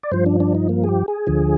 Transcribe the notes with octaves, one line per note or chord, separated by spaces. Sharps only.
D5
G2 F3 C5
D4
D4
D#4
A#3
G#4
G4
G#4
D2 D3 F3